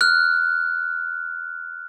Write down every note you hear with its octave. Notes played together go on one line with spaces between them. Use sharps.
F6 F#6